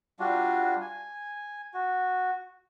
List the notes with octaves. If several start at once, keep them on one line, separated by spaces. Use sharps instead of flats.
G3 D4 F4 F#4
G#5
F#4